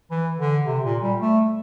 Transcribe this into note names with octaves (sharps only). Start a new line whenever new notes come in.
E3
D3
C3
A#2
G3
A3